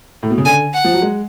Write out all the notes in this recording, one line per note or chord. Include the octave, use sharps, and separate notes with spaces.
A2
B2
C#3
D3 G#5
F#5
F3
F#3
G#3